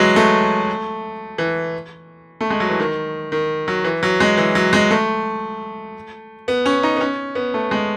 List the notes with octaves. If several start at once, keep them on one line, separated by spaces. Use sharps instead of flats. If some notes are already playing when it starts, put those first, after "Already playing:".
Already playing: E3 F#3 G#3
A3
E3
A3
G#3
F#3
E3
D#3
D#3
F#3
E3
F#3
G#3
E3
F#3
G#3
A3
B3
C#4
D#4
B3
C#4
B3
A3
G#3